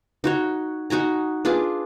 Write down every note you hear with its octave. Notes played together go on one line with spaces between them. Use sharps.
D#4 F#4 C#5
D#4 F#4 G#5 A#5
D4 F4 G#4 B4